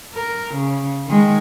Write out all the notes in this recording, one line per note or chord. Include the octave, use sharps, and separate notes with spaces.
A#4
C#3
D#3 G#3